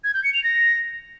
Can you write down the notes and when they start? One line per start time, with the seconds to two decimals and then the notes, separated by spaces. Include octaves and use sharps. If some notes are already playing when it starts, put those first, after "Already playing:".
0.04 G#6
0.14 G6
0.24 C#7
0.34 F7
0.44 A#6